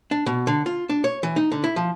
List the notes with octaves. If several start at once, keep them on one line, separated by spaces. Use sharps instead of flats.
D4
B2
D3
F4
D4
C#5
E3
D#4
D3
E4
F3